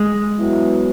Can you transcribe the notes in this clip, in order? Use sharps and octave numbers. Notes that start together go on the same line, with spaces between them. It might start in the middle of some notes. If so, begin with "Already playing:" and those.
Already playing: G#3
F#3 B3 E4